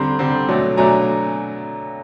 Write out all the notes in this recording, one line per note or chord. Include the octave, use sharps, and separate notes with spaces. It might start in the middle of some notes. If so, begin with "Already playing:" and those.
Already playing: D3 G3 C4 A#5 C6
D3 G3 C4
B2 F#3 A3 D4
B2 F#3 A3 D4 G#5 A#5